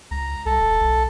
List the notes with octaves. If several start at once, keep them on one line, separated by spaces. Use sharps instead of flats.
C#2 A#5
C2 A4
D#1
B1